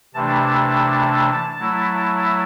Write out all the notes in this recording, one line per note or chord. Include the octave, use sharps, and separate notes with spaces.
C3 E3 A3 D4 A5
F#3 A3 E4